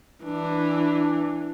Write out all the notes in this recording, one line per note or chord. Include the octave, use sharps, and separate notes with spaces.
E3 D4